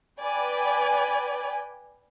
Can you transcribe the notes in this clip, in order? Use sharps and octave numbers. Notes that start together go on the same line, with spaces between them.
B4 D5 G5 G#5